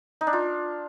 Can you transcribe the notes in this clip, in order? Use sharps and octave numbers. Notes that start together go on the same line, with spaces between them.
D#4
D4
F4